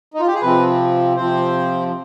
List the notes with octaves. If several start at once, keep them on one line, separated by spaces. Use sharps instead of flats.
D#4
F4
G4
G#4
C3 F3 C4 B4
C3 F3 C4 C5